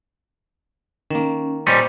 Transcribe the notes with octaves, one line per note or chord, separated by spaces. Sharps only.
D#3 A#3 C#4
A#2 G3 C#4 C5 D#5 D6